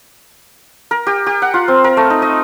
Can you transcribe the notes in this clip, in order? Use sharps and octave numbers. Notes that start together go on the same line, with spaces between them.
A#4
G4
G4
F#5
F4
C4
A#4
A3
D#4
D#5